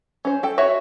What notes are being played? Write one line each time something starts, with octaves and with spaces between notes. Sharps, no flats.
C#4 C5
A4 G5
F#4 C#5 E5